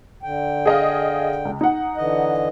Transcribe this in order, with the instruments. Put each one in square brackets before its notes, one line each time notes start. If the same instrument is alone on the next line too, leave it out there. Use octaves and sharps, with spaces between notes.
[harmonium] D3 G5
[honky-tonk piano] G#4 D#5 F5
C#2
D#4 F#5
[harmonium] D3 E3 D#5